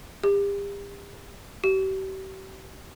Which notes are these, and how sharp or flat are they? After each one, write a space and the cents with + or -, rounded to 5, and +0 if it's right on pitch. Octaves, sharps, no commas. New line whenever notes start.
G4 +40
G4 -40